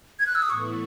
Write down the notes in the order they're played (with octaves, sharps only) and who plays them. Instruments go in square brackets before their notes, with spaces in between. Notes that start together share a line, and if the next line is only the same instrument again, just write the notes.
[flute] G#6
F#6
E6
D#6
[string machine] A2 E3 B3 E4 A4 [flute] C#6